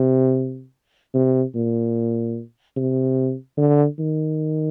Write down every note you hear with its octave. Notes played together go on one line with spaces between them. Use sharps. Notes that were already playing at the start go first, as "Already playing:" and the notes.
Already playing: C3
C3
A#2
C3
D3
D#3